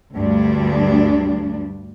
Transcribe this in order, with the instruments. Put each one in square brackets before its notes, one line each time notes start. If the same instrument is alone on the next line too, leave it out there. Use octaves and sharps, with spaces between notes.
[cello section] D2 G2 G3 D4